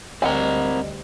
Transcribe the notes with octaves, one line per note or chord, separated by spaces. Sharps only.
D2 G3 C4 A#4 D#5 F#5 G#5